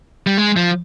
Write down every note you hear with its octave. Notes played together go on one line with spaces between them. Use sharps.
G3
G#3
F3